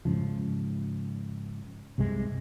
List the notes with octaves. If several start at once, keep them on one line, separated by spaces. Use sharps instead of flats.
G#2 C#3 F3
C2 G2 C3 G#3